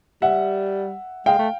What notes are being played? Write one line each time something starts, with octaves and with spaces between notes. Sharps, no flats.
G3 E5 F#5
G#3 F5 G5
A3